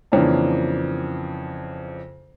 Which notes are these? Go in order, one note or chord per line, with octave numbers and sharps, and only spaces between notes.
F2 C#3 E3 A#3 D4